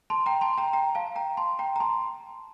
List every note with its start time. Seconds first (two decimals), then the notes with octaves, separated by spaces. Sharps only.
0.10 A5 C6
0.26 G5 A#5
0.41 A5 C6
0.57 G5 A#5
0.73 G5 A#5
0.95 F5 A5
1.16 G5 A#5
1.37 A5 C6
1.59 G5 A#5
1.76 A#5
1.80 A5 C6